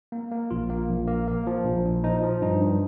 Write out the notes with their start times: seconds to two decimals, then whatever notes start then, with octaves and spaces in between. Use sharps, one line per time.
0.12 A#3
0.32 A#3
0.50 A#1 F4
0.70 A#3
0.89 A#1
1.08 A#3
1.28 A#3
1.47 F3
1.65 A#1
1.85 A#2
2.04 F3 D#4
2.23 F3
2.41 G2 D#4
2.61 G2